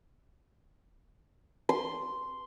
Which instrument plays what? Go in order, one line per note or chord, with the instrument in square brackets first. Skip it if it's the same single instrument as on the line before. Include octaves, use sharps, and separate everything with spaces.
[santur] C6